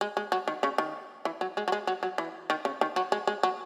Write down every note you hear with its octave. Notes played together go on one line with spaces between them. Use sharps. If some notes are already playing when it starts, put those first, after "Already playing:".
G#3
G#3
F#3
D#3
C#3
D#3
E3
F#3
G#3
F#3
G#3
F#3
F#3
E3
D#3
C#3
D#3
F#3
G#3
G#3
F#3